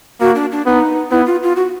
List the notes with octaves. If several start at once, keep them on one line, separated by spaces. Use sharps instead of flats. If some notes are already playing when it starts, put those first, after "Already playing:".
A#3 F#4
D4
D4
B3 D#4
B3 E4
F4
F4
F#4